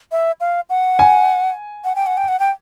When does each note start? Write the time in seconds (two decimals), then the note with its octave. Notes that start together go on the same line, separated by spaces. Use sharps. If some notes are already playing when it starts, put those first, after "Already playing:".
0.12 E5
0.40 F5
0.70 F#5
0.99 G#5
1.84 F#5
1.96 G5
2.06 F#5
2.17 G5
2.28 F#5
2.40 G5